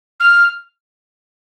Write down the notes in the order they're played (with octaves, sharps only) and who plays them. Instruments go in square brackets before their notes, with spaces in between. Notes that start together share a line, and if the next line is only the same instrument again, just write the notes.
[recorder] F6